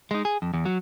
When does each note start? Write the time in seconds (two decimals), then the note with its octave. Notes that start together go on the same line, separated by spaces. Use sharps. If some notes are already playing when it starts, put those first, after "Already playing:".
0.11 G#3 D#4
0.25 G#4
0.42 F2
0.54 E2
0.66 F#3